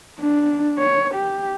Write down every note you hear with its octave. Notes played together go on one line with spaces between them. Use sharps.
D4
C#5
G4